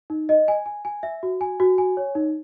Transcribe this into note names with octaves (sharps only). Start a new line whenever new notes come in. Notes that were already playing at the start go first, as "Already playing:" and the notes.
D#4
D#5
G#5
G#5
G#5
E5
F#4
G#5
F#4
G#5
C#5
D#4